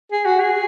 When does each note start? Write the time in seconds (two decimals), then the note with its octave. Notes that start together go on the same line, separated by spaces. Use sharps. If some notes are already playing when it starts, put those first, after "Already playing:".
0.12 G#4
0.25 F#4
0.40 G#4